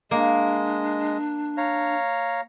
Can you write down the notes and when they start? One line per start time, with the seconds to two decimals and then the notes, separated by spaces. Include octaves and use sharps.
0.11 G#3 A#3 D4 D#5
1.57 C#5 F5 A#5